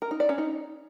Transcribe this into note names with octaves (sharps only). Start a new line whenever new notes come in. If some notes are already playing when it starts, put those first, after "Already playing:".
A#4
D#4
D5
C#4
D#4